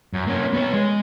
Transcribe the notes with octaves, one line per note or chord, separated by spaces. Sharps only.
F#2
A#3 C#4
B3 C#5
G#3